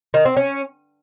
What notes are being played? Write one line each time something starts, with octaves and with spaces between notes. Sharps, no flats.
D#3
C4
C#4